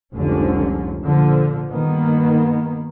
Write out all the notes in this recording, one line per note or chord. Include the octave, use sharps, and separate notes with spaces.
F1 C2 G#2 D3 F3 C#4
A#2 D3 F3
G2 D#3 A#3 B3